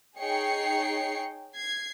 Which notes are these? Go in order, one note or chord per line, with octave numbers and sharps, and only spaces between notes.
D#4 G#4 C#5 G5 C7 C#7
G#6 C7